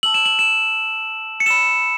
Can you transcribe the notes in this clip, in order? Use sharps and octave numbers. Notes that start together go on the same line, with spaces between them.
A5 E6 F#7
E7
F#7
E7
C#7
B5 E6 E7